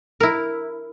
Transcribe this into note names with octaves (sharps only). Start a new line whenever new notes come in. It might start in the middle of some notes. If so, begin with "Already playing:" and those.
E4 A#4